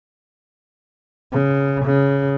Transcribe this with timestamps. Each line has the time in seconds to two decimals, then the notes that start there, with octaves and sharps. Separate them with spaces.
1.33 C#3
1.86 C#3